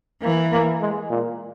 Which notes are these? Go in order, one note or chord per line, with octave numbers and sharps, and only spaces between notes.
E3 A#3
A#3
G#3
A#2